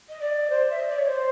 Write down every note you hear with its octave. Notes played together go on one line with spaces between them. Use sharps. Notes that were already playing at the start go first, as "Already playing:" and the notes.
D#5
D5
C5
E5
D#5
D5
C#5
C5